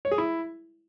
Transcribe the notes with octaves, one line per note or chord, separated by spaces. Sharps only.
C#5
G#4
E4